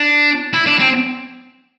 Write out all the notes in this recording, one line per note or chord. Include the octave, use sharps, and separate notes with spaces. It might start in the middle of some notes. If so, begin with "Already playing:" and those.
Already playing: D4
E4
D4
C4